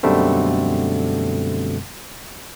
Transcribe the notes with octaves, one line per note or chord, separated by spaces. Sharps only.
F#2 B2 D3 G3 A3 C4